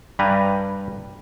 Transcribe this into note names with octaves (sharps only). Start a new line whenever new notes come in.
G2 G3 G4 B4 G#5 A#5